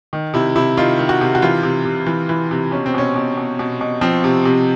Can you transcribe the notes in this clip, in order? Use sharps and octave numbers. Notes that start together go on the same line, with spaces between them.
D#3
C3 E4
C3 E4
D#3 F4
D#3
F#4
C3
F#4
E3 F4
C3
C3
E3
E3
C3
B2 C#4
C4
B2 C#4
B2
B2
B2
B2
F3 C4
C3
C3